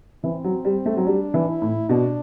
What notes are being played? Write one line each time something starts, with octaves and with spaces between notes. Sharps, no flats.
E3 C4
F#3
G3
A3
F#3
G3 D4
E3
E4
A2
B2 D4